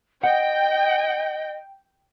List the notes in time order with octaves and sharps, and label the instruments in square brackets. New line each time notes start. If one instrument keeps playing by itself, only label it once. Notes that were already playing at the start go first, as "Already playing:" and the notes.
[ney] D#5 [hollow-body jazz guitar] F#5 [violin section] G5